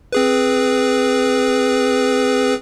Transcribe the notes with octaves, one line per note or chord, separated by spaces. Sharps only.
C4 G#4 B4